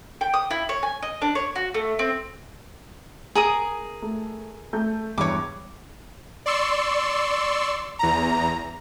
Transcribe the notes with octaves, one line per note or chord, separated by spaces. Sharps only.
G5
D#6
E4
C#5
G#5
D#5
D4
C#5
F#4
A3
C4
G#4 A#4 D#6
A3
A3 G6
E2 G2 C#5 D6
D5 C6 C#6 E6
E2 A#5